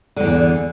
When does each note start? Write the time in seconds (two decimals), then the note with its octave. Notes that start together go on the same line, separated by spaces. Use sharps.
0.16 D3
0.20 G#2
0.23 E2